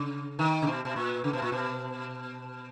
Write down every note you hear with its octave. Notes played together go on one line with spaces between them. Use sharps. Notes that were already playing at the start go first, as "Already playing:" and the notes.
Already playing: C#3
D#3
C#3
B2
B2
A#2
C#3
B2
A#2
B2